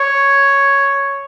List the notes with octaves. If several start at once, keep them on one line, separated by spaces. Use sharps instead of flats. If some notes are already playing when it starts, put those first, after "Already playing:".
Already playing: C#5